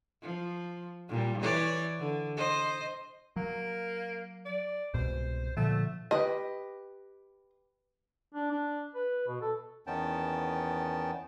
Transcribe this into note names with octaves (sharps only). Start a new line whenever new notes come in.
F3
A#2 G3
E3 C#5 D5
D3
C5 D#5
F#3 A#3
D5
C2 G#2 B2 C5
A#2 D3 F3 A3
G4 B4 D#5
D4
D4
B4
B2
A4
E2 D#3 B3 C#4 G5 A5